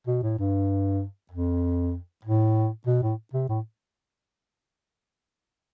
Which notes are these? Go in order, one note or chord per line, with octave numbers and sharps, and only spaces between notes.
B2
A2
G2
F2
A2
B2
A2
C3
A2